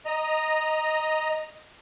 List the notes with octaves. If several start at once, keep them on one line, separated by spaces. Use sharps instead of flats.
D#5 A#5